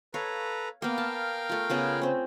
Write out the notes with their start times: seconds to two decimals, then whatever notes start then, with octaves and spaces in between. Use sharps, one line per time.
0.14 A4 B4 C#5 F5 A#5
0.82 A#3 B3 A#4 F5 G5
0.98 A5
1.49 A3 F4
1.69 C#3 B3 F4
2.02 C4 C#4